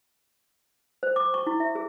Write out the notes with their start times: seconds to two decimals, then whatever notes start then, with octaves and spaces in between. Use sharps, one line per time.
1.03 C5
1.16 D6
1.34 C#6
1.47 E4
1.60 E5
1.75 G#4